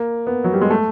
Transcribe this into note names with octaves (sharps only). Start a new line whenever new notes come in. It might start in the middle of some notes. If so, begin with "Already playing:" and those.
Already playing: A#3
B3
F#3
G3
G#3
A3